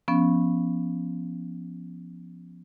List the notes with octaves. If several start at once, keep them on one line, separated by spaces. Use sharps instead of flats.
F3 B3 C#4